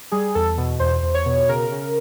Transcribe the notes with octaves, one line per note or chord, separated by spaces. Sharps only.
G3 G#4
E2 A4
B2
E2 C5
E2
C#5
B2
C#3 A#4
C#3